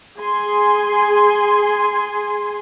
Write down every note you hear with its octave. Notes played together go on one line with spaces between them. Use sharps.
G#4 G#5 C6